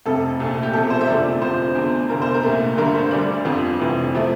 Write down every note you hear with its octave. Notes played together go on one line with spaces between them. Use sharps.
F1 F2 C3 A4
C2 A#2 A3
G4
E1 E2 C3 F3 A3 A4
C5
E5
F1 E2 D3 F3 A3 D5
F1 F2 D3 F3 C5
E2 D3 A3
F1 E2 D3 A#4
C5
A#4
C2 A#2 A3
G1 G2 D3 A3 A#4
C5
D2 D3 G3 D5
G1 F2 D3 F3
F1 F2 E3
C3 F3 A3